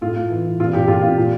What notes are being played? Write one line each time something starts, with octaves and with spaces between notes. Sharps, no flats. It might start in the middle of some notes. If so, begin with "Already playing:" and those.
A2 F4
A2
E3
E3
A#2 F4
A#2 G4
A#2 F4
A#2 F4
A#2